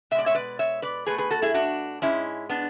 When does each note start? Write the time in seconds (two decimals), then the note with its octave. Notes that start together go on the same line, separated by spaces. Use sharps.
0.11 B2 E5
0.15 G#3 D5
0.26 C#5 E5
0.35 B4 D5
0.59 C#5 E5
0.82 B4 D5
1.06 B2 G#4 B4
1.10 A3
1.18 G#4 B4
1.30 F#4 A4
1.42 E4 G#4
1.54 D4 F#4
2.02 G#2 G#3 C#4 E4
2.49 B3 D4